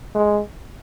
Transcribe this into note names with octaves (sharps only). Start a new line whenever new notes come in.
G#3